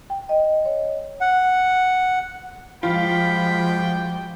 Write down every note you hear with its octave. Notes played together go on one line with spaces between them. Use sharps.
G5
D#5
C#5
F#5
F3 G3 G#3 F4 F#4 G5 B5